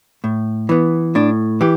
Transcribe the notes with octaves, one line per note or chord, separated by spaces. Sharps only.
A2
E3 B3
A2 D4
E3 G4